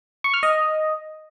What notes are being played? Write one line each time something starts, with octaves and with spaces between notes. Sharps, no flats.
C#6
F6
D#5